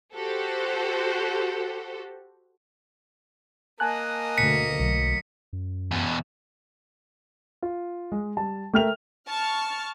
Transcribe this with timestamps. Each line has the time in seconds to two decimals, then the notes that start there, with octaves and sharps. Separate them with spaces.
0.15 F#4 G4 A4 C5
3.80 A#3 D#5 G#5 A5 F#6
4.38 D2 B2 B6 C#7
4.80 B1 F#3
5.53 F#2
5.91 E2 B2
7.62 F4
8.12 G#3
8.37 G3 A5
8.74 A3 A#4 E5 G5 F6 F7
9.27 A5 C#6 F6